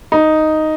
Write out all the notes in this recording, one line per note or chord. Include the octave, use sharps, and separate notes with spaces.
D#4